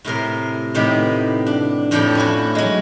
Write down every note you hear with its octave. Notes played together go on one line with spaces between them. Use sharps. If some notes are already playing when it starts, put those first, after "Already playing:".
A2 C3 A#4 C6
A2 C3 D#3 B3 G4
D4
F2 A2 F3 A4 D5 G5
C#4 E4 F#4
F#3 G#3